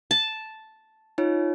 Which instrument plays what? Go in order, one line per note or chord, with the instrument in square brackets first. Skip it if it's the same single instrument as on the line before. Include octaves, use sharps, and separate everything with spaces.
[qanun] A5
[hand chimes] D#4 F4 C#5